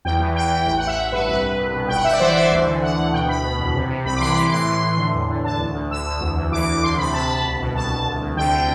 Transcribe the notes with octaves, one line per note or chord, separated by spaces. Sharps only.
E2 G5
E3
E3 G5
E3
A1 G5
F#5
A1 E5
A1
G2 B4
C2 B4
C2
C2
B2
G1 G5
F#5
G1 E5
D5
E3 C5
E3 D5
D2
D3
D2 F#5
D2
B2 G5
B2 B5
B2
E2
C3
C3
C2 B5
D6
E3 C6
E3 D6
A2 C6
E3
A2
D3
E2
D3
D3 A5
D2
D2
D3 E6
D2
E2
E2
E3 D6
E2
D2 C6
C3 B5
D2 A5
D2
C2
B2
C2 A5
C2
D2
D2
D3 G5
D3